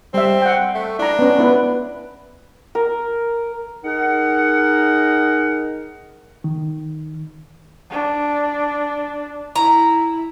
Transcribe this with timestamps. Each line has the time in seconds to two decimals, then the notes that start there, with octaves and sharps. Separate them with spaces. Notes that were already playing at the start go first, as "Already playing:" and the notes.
0.14 G3 C4 E5
0.42 F#5 G5
0.75 A3
0.99 D4 E4 A#5
1.19 B3 C#4
1.39 B3 E4 B4
2.75 A#4
3.84 D#4 G#4 A#4 F#5
6.44 D#3
7.90 D4
9.56 E4 A#5